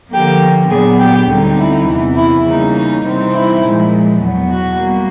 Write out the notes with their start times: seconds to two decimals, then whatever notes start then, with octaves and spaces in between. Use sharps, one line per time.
0.12 D3 F3 A#3 G4
0.70 A#2 F#3 B3 D4 G#4
1.00 G4
1.29 D2 D3 G3 C4 D#4
1.59 E4
1.87 E2 C3 E3
2.17 E4
2.46 C#3 E3 G3 A#3 D#4
2.75 D#4
3.04 C3 E3 G3 C4 D#4
3.34 E4
3.63 A#2 F3 G#3
4.21 E2 B2 F#3 B3
4.51 F#4
4.80 G3 A#3